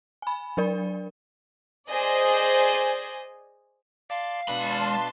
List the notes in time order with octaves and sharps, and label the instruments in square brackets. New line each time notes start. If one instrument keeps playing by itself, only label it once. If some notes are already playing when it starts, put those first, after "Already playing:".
[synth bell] G#5 B5
F#3 D4 A#4 D5
[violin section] G#4 C5 D5 D#5 G#5
[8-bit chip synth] D5 A5 C6 [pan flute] F5
[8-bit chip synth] B2 D4 B4 [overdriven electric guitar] G#3 B5 [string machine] A5 C6